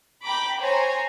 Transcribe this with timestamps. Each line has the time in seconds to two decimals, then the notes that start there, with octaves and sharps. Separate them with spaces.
0.23 G5 A#5 B5 D6
0.60 C5 C#5 G#5 A#5